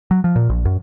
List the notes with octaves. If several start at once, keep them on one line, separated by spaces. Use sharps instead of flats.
F#3
F3
A#2
A#1
F#2